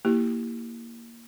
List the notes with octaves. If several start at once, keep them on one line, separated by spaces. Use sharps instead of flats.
A#3 E4 G4